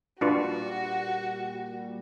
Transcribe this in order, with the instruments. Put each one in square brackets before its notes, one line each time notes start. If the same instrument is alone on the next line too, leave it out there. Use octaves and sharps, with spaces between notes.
[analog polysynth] A#2 G3 [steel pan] D4 F4 B4 [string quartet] F#4